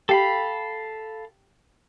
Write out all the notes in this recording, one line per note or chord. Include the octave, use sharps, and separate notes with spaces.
G4 A4 F5 B5